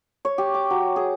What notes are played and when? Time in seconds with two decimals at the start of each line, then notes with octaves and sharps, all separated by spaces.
0.25 C#5
0.38 G4
0.54 D6
0.70 F#3
0.96 G#4